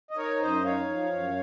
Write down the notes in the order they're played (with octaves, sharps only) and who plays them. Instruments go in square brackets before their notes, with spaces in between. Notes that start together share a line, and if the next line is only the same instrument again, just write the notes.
[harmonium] D#5
D#4 A#4 C#5
F#2 C5 D#5
D#4 C#5 F5
F3
F#2